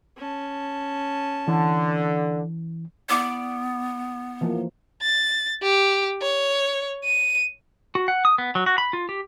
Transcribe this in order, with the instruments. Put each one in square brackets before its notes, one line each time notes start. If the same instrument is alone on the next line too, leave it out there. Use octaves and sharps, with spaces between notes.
[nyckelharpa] C#4 A5
[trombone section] D3 [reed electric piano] E3
[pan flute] B3 [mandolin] E4 D5 D6
[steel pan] E3 F3 A#3
[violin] A6
G4
C#5
D#7
[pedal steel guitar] F#4
F#5
D#6
B3
F#3
F#4
B5
F4
G4